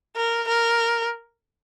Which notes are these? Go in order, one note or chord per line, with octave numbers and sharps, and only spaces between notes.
A#4
A#4